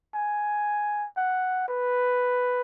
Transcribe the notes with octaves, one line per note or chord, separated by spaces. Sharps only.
G#5
F#5
B4